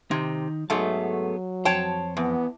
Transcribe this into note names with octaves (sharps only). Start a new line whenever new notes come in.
C3 D#3 D#4
G#2 F#3 A3 B3 G#4 A5
F2 C5 C#5 G5 A5
E2 B3